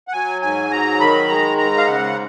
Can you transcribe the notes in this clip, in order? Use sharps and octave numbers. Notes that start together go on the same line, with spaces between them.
F#5
F#3 G#5
G#2 G#5
F#3 A#5
D#3 B5
G#3 A#5
G#2 A#5
F5
C#3 F#5